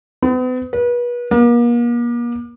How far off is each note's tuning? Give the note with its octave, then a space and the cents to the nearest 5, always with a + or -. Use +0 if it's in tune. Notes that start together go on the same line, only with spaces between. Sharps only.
B3 +40
B4 -35
A#3 +40